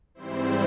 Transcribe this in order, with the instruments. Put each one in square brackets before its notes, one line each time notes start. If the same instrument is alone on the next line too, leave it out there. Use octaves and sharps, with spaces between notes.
[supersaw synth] G#2 E3 G3 C4 E4 C5